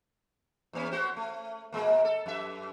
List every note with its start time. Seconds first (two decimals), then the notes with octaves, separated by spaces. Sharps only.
0.73 E2 A#3 C#4
0.92 A3 F#4 C5
1.17 A3
1.73 A#2 G#3 A#3
2.05 A4
2.26 F#2 E5